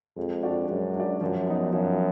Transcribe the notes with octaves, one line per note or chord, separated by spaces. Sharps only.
F2 G#3
D4 F#4 D5
F#2 G#3
D4 F#4 D5
F#2 F3
B3 D#4
F#2 F3